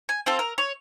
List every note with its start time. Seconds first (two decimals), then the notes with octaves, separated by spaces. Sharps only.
0.09 G#5
0.26 C4 F4 A4
0.39 A#4
0.58 C#5